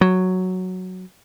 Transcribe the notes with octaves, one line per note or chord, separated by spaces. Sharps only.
F#3